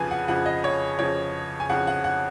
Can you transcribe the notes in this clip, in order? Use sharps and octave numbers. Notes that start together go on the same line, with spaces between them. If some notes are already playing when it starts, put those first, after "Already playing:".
Already playing: F2 C#3 F3 B4 G#5
F#5
F2 C#3 F3 F#5
D#5
C#5
F2 C#3 F3 C#5
G#5
F2 C#3 F3 F#5
F#5
F#5